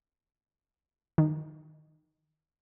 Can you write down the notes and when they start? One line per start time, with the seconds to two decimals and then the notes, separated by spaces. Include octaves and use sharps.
1.18 D#3